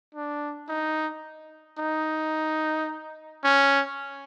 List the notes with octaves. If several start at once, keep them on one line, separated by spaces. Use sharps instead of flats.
D4
D#4
D#4
C#4